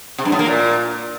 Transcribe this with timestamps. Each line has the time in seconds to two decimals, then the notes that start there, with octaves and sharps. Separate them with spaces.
0.18 C3
0.25 G2
0.32 A2
0.39 A#3
0.46 A#2